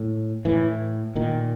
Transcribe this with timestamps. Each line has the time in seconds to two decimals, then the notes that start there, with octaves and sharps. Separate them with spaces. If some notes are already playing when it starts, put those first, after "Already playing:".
Already playing: A2
0.45 A2 E3
1.15 A#2 D#3